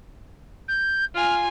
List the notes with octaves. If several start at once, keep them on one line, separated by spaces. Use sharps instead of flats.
G6
F4 G#5 F6